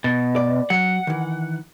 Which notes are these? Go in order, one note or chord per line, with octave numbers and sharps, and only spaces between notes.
B2
D5
F#3 F#5
D#3 E3